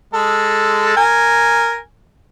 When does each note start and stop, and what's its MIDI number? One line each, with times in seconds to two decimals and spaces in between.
0.14 0.94 56
0.14 0.94 69
0.97 1.79 70
0.97 1.79 80